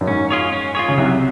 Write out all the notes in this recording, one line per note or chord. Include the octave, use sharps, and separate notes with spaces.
F#2
G#2 C#4
F4 G#4 C#5
C#4
F4 G#4 C#5
C#3
C2 C3 F#3